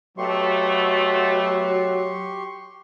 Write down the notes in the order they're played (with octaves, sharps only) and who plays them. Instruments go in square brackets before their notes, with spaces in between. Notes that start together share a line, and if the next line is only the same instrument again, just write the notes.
[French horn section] B2 A3 [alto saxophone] F#3 [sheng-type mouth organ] G4 C6 C#6